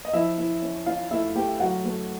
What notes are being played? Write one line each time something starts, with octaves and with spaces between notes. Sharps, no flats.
D#5
F3 E4 E5
E4
C#4
C#4 F4 F5
A3 E4 E5
A3 G4 G5
F#3 F#4 F#5
A3